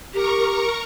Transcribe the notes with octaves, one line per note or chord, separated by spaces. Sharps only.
G4 A#4 A#5 C#6